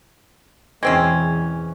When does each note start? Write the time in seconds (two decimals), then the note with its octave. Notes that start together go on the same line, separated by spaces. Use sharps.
0.83 E2 B2 E3 G#3 C4 C#4